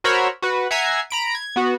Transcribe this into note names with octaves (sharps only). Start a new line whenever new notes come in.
F#4 A#4 C5 C#5 B5 E6
F#4 B4
E5 F#5 G#5 A#5 G#6 C7
A#5 B5 D7
G#6
B3 F#4